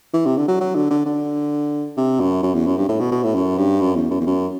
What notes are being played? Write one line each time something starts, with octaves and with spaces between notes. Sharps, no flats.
E3
C3
D3
F#3
F#3
D3
D3
D3
C3
F#2
F#2
E2
F#2
G2
A2
B2
B2
A2
F#2
G2
F#2
E2
F#2
E2
F#2